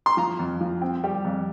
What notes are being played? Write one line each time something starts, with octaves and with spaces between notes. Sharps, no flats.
C6
F3 A#5
F2
F3
C4
G3
F2